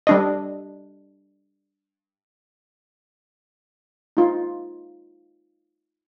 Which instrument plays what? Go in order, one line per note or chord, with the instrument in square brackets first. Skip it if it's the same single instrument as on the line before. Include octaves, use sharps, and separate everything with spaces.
[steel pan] G3 D4 D#5
D#4 F4